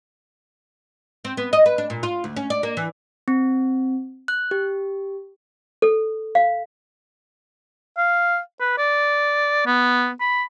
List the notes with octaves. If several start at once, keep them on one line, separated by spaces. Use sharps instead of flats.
C4
B3
D#5
B4
D4
A#2
F4
D2
C#4
D5
A#3
E3
C4
F#6
G4
A4
F5
F5
B4
D5
B3
B5